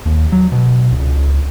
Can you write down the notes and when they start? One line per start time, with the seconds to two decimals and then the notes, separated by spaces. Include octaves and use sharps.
0.05 D#2
0.32 F#3
0.52 B2
0.92 C#2